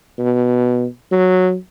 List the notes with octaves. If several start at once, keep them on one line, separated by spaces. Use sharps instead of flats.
B2
F#3